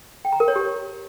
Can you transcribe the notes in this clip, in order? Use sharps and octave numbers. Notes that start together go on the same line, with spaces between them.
G5
A#5
A#4
C#5
G4